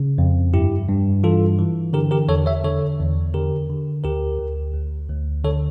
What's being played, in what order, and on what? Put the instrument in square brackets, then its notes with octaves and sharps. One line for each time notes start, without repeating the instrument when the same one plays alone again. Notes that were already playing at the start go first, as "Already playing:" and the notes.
Already playing: [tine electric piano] C#3
F2
G2 E4 G4
G2
E3 F4 A4
E3
D3 G4 A#4
G4 A#4
E2 A4 C#5
C#5 E5
D3 A4 C#5
E2
D3 G4 A#4
D3
D2 G4 A#4
D2
D2
D2
D3 A4 C#5